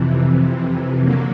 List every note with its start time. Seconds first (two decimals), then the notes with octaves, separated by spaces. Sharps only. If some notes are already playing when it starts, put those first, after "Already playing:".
Already playing: F2 C3 E3
1.02 D3 F#3 A#3